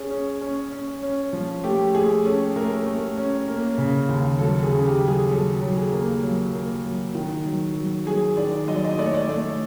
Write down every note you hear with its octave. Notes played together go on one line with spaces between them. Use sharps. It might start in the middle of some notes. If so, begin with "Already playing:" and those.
Already playing: C#4 G#4
C#4
C#4
C#4
C#4
F3
A3 G4
A3 G#4
C#4 A4
A3 A#4
A3
C#4
A#3
C#3
D#2
F#3 A4
G#4
C#3
G4
F#3
G#4
F#3 A4
F#3
G#4
A#3
F#3
A#3
F#3
D#3
F#3
F#3
F#3 G#4
D#3 D5
F#3 D#5
D5
D#5
A3 D5
C#5
D5
A3